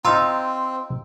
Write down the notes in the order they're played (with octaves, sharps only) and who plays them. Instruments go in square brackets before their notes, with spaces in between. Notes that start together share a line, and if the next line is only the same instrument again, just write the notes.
[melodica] C4 [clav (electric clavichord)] D#4 F4 [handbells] A#5 C6 E6